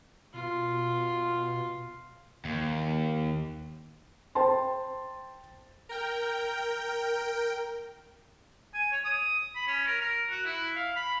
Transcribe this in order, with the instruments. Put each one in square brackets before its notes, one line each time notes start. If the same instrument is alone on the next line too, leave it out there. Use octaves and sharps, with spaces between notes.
[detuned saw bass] B2 [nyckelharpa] F4
[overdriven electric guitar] D#2
[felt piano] C5 G5 A5 C6
[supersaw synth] A#4 G5
[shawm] G#5
C#5
D#6
B5
C#4
A#4
A#4
F#4
E4
F5
B5